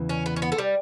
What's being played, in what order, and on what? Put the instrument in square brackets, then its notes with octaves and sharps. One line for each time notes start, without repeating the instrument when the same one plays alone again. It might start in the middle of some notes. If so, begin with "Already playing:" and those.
Already playing: [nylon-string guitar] E2 C#3 E3
[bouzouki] C#4
B3
C#4
B3
A3
G3